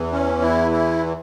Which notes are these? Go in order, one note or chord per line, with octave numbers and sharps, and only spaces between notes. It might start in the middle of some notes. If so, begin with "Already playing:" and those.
Already playing: E2 E3
C#4
E4
E4